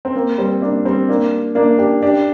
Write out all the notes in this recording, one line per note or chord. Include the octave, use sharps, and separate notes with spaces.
C4
A#3
G3 C4
A#3 D4
G3 C4
A#3 D4
A#3 D4
D4 G4
D4 G4